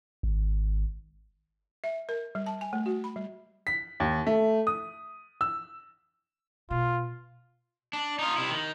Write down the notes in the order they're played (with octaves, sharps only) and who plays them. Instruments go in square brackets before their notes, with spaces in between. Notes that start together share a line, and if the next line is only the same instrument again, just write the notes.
[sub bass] G#1
[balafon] E5
A#4
G3
A5
G#5
A3
F#4
B5
G3
[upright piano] B6
D#2
A3
D#6
E6
[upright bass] B2 [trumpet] F4
[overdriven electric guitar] D4
D#4 F4
C3 E4
D#3